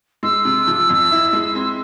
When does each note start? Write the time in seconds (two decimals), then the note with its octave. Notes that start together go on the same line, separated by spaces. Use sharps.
0.23 G#3 E6
0.45 C3
0.67 F3
0.89 F2
1.11 E4
1.33 G#3
1.55 C4